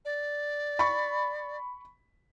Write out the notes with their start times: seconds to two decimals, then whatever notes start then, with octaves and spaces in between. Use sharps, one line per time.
0.05 D5
0.79 B5 C#6